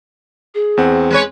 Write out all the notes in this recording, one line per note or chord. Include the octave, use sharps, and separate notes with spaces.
G#4
E2 C4 F#5
G#3 B4 C#5